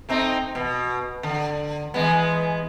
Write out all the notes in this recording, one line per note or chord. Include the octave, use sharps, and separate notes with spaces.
A3 C4 D#4
B2
D3
E3 G#3 B3